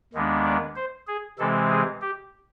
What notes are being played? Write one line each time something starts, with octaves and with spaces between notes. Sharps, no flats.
D#2 D#3 G#3 B3 D4
D5
C5
G#4
C3 E3 G#3 C4 A4
G#4
G4